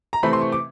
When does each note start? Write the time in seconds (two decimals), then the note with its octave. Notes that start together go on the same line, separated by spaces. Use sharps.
0.13 A#5
0.23 C3 E3 A3 C4 B5
0.33 C6
0.41 C#6
0.52 D6